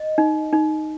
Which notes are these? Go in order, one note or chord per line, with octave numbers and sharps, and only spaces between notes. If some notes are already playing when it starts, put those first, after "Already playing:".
Already playing: D#5
D#4
D#4